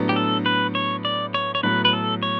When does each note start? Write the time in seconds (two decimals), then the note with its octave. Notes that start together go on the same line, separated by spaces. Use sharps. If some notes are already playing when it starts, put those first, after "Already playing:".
Already playing: A2 F#3 B3 D4
0.09 G4
0.16 A4
0.46 B4
0.75 C#5
1.05 D5
1.34 C#5
1.55 C#5
1.63 A2 F#3 B3 B4
1.85 B4
1.93 A4
2.23 C#5